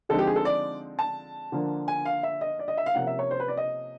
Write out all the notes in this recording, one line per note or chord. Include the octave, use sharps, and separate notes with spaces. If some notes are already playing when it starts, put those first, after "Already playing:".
D3 F3 G#3 C4 D#4 A4
G4
G#4
A4
D5
A5
D3 F3 A#3 D4
G#5
F5
E5
D#5
D5
D#5
E5
F5
C3 F3 A#3 C#4 F#5
E5
C#5
C5
B4
D5
D#5